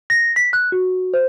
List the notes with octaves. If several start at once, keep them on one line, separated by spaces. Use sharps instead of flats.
A#6
B6
F#6
F#4
C5